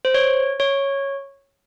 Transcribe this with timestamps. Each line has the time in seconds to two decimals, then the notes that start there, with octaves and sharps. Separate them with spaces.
0.05 C5
0.14 C#5
0.60 C#5